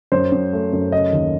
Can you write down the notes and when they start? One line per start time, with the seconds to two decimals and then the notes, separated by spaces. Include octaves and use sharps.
0.12 F#2 C5
0.32 F#2
0.53 A3
0.73 F#2
0.92 C#3 D#5
1.13 D#2